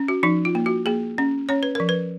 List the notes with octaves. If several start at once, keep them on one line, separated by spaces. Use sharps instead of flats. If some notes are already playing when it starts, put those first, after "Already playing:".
Already playing: C#4
F#4
F3 D#4
F4
A#3
F#4
A#3 G#4
C#4
C#4 C#5
B4
F3 A#4
B4